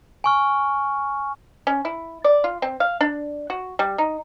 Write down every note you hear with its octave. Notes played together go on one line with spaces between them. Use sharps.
G#5 C#6 F6
C#4
E4
D5
F4
C4
F5
D4
F#4
G3
D#4